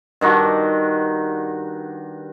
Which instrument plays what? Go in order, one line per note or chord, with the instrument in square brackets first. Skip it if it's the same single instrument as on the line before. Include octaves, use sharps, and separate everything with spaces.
[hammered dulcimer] G2 D#3 F#4